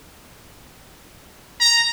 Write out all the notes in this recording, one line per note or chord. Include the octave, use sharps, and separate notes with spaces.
A#5